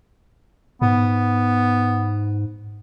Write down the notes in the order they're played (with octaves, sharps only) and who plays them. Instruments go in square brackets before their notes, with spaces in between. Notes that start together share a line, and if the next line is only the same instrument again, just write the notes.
[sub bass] G#2 [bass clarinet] B3